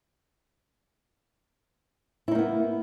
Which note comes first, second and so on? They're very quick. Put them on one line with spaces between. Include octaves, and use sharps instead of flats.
E4 D#4 A#3 B3